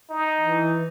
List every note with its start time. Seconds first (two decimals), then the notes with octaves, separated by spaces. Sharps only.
0.10 D#4
0.41 E3